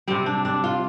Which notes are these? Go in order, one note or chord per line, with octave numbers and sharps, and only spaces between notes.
C3 G3 C4
D4
D4
F4